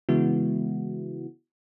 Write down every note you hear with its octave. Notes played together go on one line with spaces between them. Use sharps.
C#3 E3 G#3 B3 E4 F#4